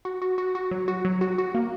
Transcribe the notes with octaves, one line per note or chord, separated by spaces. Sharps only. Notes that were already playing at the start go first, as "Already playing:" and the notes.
F#4
F#4
F#4
F#4
F#3
F#4
F#3
F#4
F#4
A#3